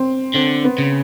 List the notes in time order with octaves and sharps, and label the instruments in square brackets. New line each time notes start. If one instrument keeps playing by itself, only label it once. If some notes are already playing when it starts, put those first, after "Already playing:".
Already playing: [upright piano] C4
[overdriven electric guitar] D3 [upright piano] C4
[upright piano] B3
[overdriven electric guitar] C#3